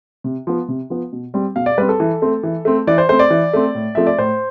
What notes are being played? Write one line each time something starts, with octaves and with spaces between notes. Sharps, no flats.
C3
F3 B3
C3
F3 B3
B2
G3 C4
B2 F5
D5
G3 C4 B4
A4
E3
A3 C4
E3
A3 C4
E3 D5
C5
A3 C4 C5
D5
E3
A3 C4
A2
F3 A3 C4 E5
D5
A2 C5